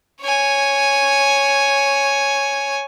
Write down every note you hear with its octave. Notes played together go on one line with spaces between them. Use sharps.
C#5 G#5